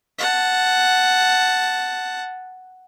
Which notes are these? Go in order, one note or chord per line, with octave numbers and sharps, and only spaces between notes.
F#5 A5